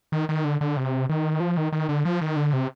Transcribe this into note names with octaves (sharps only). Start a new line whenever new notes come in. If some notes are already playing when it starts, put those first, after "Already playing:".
D#3
D#3
D3
D3
C3
D#3
F3
D#3
D#3
D3
F3
D#3
D3
C3